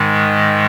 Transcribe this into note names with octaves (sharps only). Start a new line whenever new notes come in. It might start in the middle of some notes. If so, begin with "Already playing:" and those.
Already playing: G#2 D#3 G#3